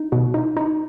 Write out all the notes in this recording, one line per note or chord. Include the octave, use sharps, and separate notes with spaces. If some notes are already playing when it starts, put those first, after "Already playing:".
Already playing: D#4
B2
D#4
D#4